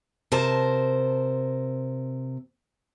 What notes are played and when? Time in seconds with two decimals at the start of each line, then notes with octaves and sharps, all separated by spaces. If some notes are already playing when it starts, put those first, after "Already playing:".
0.32 C3 A#4 C5 A5